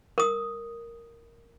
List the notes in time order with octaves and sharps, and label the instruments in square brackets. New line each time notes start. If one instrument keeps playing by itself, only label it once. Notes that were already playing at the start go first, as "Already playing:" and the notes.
[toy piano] A#4 D#6